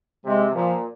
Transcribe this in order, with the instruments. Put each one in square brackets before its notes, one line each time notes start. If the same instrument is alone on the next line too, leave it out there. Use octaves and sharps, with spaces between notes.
[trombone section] C3 [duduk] G#3
[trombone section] A#2 [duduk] F3